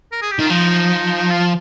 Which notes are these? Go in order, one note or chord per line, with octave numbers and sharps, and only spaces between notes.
A#4
G#4
G4
D#3 F4
F3 D#4
D#4
F4